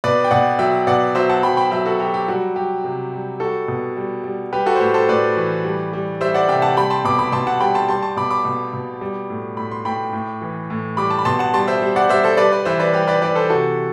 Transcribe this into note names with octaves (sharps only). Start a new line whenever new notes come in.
B2 B4 D5
G5
B2 D5 F#5
F#3 E5 G5
B2 D5 F#5
F#3 C5 E5
F#5 A5
F#3 G5 B5
G5 B5
F#3 E5 G5
F#4 A4
F#3 G4
G4
G3 F#4
G3 G4
C3
G3
G3 F#4 A4
B2
G3
G3
G3 G4 B4
F#4 A4
C5
A2 G4 B4
A4 C5
A2 B4 D5
E3
G3
G3
G3 C5 E5
D5 F#5
C3 E5 G5
F#5 A5
G3 G5 B5
A5 C6
B2 B5 D6
B5 D6
B2 A5 C6
F#5 A5
G3 G5 B5
A5 C6
G3 A5 C6
A5 C6
B2 B5 D6
B5 D6
B2
B2
G3
A2
A2 B5
C6
A2 G5 B5
A2
E3
A2
G3 B5 D6
A5
B5
B2 A5 C6
F#5 A5
G3 A5 C6
C5 E5
G3
D5 F#5
G3 C5 E5
A4 C5
G3 B4 D5
B4 D5
E3 C5 E5
B4 D5
G3 G4 B4
B4 D5
E3 B4 D5
A4 C5
C3 F#4 A4